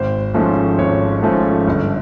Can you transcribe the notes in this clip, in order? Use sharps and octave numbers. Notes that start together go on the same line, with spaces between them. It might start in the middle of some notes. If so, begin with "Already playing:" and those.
Already playing: G#1 C5
G#2 F3 A3 C#4
G#1 C#5
G#2 F3 A3 C#4
G1